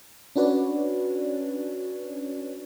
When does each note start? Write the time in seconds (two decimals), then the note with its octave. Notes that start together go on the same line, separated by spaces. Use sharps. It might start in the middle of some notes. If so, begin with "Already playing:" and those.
0.36 C#4 D4 F#4 B4 C#5 D5